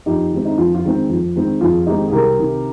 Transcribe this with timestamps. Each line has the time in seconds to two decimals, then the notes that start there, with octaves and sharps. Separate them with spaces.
0.06 F2 D#4 G4
0.32 D#3 G#3 C4
0.45 D#4
0.58 F2 F4
0.75 F4
0.84 D#3 G#3 C4
1.09 F2
1.36 D#3 G#3 C4
1.61 F2 F4 G#4
1.87 D#3 G#3 C4 D#4 G4
2.08 G#4
2.12 C2 G4 A#4
2.38 C3 D#3